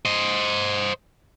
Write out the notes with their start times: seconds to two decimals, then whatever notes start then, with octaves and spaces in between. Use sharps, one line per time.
0.05 C5 D#5